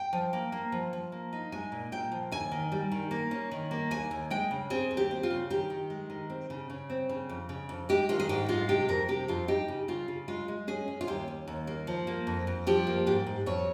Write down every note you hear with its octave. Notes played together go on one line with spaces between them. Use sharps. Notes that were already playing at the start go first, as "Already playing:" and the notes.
Already playing: G5
F3
A#3
A#3
F3
F3
A#3
D#4
G#3 G#5
A#2
A#2 G5
F3
D#2 G#5
D#3
G3
D#3
A#3
C#4
D#3
A#3
D#2 G#5
D#2
G#3 G5
C#3
C4 G#4
D#2
G4
C4
F4
C#3
D#3 G4
D#3
G#3
D#3
C4
C#3
C#3
C4
C#3
F2
C#3
F2
G#3 G4
D#3 F4
G#4
G#2 G4
G#3 F4
C3 G4
F2 A#4
C3 G4
F2 F4
D#4 G4
C#3
C#3 F4
C#3
G#3 F4
G#3
C#4 G#4
C#4
F4
D#2 G4
C#4
D#2
A#3
F3
A#3
F2
F2
F3 G4
A#3
G#2 G4
G#2
F2 C#5